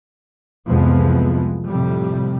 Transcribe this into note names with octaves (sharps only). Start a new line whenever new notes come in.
C2 F2 E3 F3 G#3 B3
F2 A2 C3 G3